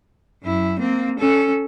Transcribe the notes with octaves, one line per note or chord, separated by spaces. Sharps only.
F#2 E4
A#3 C4
C#4 A4